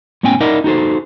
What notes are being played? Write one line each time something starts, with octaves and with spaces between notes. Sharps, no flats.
A2 B3 C#4 G5 G#5
D#4 E4 A#4 D5 D#5 F#5
D#4 F#4 A4 C5